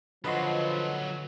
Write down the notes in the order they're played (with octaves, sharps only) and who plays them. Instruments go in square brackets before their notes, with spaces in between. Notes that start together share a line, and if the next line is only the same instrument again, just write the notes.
[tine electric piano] D3 F#4 [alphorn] F3 [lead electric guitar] F#3 A4 [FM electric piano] B4 D#5 C6